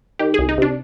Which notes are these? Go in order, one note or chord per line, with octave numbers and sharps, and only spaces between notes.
D#3 G4
G#4
C2
D#4
C3 D4